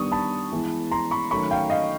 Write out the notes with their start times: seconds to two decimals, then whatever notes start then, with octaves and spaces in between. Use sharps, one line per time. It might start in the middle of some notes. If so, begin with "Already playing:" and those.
Already playing: D#3 G3 B3 D4 C#6 D#6
0.12 A5 B5
0.52 E3 G#3 B3
0.91 A#5 C6
1.11 B5 C#6
1.30 D#3 F#3 A3 C#4 B5 C#6
1.51 F5 G5
1.70 D#5 F5